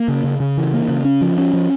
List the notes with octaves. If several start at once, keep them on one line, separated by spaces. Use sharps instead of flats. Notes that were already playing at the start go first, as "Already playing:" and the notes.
Already playing: A#3
C#3
C#3
C#3
E3
A#3
C#3
C#4
F3
C#4
F3